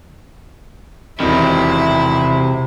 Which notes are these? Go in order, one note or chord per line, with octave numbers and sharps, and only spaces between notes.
E1 C3 D#3 E4